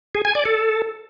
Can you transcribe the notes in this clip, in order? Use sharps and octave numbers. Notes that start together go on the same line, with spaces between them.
G#4
G#5
D5
A4